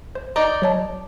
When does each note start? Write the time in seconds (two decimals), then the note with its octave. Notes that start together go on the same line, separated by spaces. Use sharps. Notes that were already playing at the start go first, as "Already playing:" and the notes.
0.15 C5
0.36 D#4 D5
0.62 F#3 C#5 A5